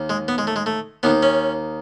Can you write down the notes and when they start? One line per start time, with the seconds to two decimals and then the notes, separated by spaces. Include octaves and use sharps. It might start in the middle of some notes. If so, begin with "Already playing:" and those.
Already playing: D#2 D#3
0.10 G#3
0.28 B3
0.38 G#3
0.47 A3
0.56 G#3
0.66 A3
1.03 D#2 D#3 B3
1.23 C#4